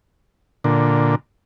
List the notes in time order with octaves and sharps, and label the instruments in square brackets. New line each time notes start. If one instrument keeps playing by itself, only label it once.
[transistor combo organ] A#2 D3